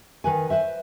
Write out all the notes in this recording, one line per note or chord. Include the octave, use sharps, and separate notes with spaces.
D#3 B4 G#5
B4 C5 E5